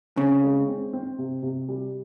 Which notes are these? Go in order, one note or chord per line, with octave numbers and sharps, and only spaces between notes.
C#3 C4
G#3
C4
C4
C3
C3
G3